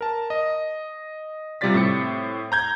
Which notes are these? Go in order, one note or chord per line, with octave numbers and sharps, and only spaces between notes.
A#4 A5
D#5
C3 G3 F4 D5 A6 B6
A2 C4 D6 C#7
A#5 G6 G#6